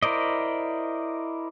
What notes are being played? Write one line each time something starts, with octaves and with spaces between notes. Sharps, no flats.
E4 A#4 C5 D5 D#5